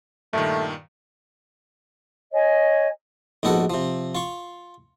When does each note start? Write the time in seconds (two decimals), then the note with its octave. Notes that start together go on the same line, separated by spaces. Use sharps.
0.33 G2 A#2 D#3 A3
2.32 C#5 D#5 G#5
3.43 A#1 G#2 B3 F#4 A4 F#5
3.70 C3 F3
4.15 F4 C#6